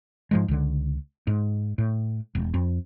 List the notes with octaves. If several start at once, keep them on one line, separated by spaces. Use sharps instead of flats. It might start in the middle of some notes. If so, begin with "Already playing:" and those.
G#2 F3 G#3
C#2 D3
G#2
A2
E1
F2